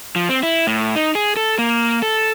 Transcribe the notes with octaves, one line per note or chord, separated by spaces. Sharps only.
F3
C4
E4
A2
D#4
G#4
A4
A#3
A4